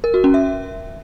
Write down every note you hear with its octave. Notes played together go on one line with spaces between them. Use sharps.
A#4
F#4
C#4
E5